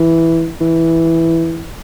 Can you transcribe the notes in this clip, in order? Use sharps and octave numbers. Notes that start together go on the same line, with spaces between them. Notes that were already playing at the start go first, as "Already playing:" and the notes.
Already playing: E3
E3